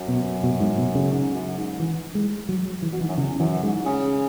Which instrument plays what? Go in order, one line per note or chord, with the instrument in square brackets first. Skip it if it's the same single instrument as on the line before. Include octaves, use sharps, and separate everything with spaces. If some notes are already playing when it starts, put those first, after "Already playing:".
Already playing: [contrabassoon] F#2
[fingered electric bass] B2
B2
G#2
B2
C#3
[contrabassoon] G#2
F#2
G#2
[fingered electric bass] E3
G#3
F#3
F#3
E3
[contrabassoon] B2
[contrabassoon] G#2 [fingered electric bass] E3
[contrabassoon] F#2
[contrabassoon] E2 [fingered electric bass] C#3
[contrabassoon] F#2 [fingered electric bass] E3
[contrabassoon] G#2 [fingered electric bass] G#3
[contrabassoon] C#3